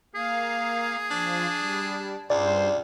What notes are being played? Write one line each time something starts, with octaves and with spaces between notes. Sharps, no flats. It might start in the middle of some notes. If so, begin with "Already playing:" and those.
A#3 G#4 F5
F3 D4
G3
C#2 G2 C5 D5